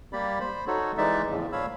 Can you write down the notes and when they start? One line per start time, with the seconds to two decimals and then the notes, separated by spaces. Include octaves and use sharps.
0.13 G3 A#3 G4 D5 B5
0.40 C5 B5
0.67 D#4 F#4 A4 C#5
0.98 E3 G#3 D#4 D5 E5
1.30 E2 A2 C#3 F3
1.52 A#2 F3 C#5 F5 B5 E6